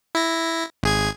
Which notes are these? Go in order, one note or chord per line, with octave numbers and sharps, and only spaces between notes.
E4 A#6
G#1 G#4 G#6